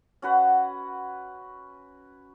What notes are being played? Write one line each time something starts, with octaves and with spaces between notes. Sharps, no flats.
C#4 F#4 B4 F#5